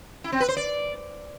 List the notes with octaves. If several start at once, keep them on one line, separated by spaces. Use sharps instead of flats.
E4
C4
B4
C5
D5